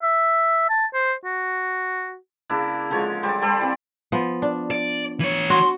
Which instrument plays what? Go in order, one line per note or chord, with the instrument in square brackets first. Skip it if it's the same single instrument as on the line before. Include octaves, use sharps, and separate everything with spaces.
[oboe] E5
A5
C5
F#4
[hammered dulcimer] C#3 A#3 D4 E4
D3 F3 G#3 C#5
F#3 G3 C5 D5
G3 A4 C5 D5
A#3 C4 E4
[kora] F3 B3
D4
[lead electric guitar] D5
E3 C#5
[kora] F#4 [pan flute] C6